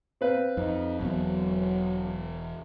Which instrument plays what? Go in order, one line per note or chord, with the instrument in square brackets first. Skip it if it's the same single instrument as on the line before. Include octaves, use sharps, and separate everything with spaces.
[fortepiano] C4 B4 F5
[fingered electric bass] F2 [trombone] D#4
[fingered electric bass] E1 E2 B3 [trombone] F#3